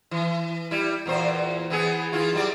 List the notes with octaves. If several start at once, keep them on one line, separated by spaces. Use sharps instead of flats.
E3
G3 E4
E2 A#2 C5
E3 B3 G#4
E3 E4 F4
F#2 G3 D5